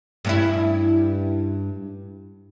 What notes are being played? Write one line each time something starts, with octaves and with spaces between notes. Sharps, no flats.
G2 C#4 E4